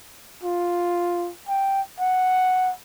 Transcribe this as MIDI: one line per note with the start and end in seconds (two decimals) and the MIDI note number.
0.43 1.30 65
1.48 1.81 79
2.00 2.72 78